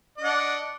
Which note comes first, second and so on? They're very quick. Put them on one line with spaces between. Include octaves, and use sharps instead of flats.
D#5 D4 F#5